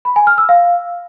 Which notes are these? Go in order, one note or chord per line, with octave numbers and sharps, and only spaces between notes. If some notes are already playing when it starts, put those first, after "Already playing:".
B5
G#5
F6
E6
F5